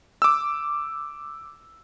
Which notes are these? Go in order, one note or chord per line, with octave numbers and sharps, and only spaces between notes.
D6 E6